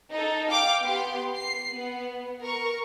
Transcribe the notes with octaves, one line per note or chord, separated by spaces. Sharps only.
D#4 A4
F5 G5 D6
B3 G4 C6
C7
B3
A#4 C#6